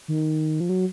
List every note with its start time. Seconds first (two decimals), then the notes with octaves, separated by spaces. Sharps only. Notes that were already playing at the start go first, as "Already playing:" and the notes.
0.08 D#3
0.60 F3
0.69 F#3